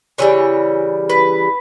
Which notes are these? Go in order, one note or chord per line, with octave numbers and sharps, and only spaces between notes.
C#3 E3 G3 C#5
B4